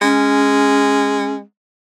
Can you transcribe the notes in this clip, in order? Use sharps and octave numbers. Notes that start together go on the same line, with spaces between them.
G#3 C#4